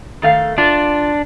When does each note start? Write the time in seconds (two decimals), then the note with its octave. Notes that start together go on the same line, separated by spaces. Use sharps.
0.22 D#3 A3 F5
0.58 D4 F4